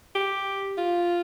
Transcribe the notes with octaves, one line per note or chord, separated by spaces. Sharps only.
G4
F4